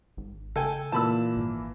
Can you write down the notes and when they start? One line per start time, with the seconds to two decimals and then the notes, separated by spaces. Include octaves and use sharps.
0.17 G#1
0.56 C#3 A4 G5 G#5
0.92 A#2 E3 A#3 A5 B5 E6
1.36 G#1